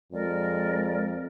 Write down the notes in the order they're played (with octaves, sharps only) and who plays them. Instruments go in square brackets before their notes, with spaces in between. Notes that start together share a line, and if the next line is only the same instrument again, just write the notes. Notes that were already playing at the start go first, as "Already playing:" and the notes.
[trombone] F2 [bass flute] G#3 [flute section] A#4 D5